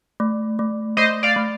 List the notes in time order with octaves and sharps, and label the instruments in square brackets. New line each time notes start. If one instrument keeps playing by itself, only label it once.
[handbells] A3
A3
[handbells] A3 [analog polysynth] C5 D#5
[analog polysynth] D5 F5
[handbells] A3